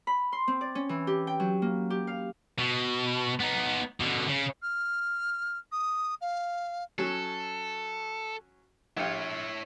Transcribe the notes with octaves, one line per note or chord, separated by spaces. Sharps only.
B5
C6
C4
D5
C#4
E3
G4
G5
F#3
A#3
G4
F5
B2
B3 D#4
B2 D3
C#3
F6
D#6
F5
F#3 C#4 A4
A#1 E4 G4 C#5 F5